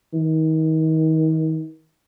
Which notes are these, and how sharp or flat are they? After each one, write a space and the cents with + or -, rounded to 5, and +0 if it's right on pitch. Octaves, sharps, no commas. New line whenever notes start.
D#3 +35